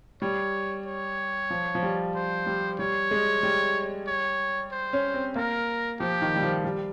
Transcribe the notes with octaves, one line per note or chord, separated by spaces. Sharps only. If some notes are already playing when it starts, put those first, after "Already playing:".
G3 C#5
C#5
F3
F3
G3
C5
G3
G3 C#5
G#3
G3
C#5
C5
C#4
C4
A#3 A#4
F3 G4
D#3
G3
F3
G3